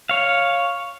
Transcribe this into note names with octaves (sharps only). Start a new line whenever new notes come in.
C#5 F5